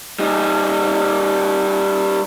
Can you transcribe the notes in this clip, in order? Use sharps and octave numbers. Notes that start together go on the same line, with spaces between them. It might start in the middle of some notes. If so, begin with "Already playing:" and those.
G3 D#4